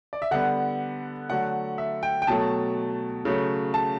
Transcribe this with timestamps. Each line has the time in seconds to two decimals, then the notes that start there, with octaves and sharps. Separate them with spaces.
0.13 D5
0.22 E5
0.31 D3 G3 B3 F#5
1.30 D3 F#3 A3 F#5
1.78 E5
2.03 G5
2.22 G5
2.27 B2 F#3 A3 A5
3.25 C#3 F#3 A3
3.74 A5